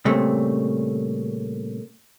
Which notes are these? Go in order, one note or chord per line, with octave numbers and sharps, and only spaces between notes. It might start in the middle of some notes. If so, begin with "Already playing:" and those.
A#2 C#3 G3 A3 C4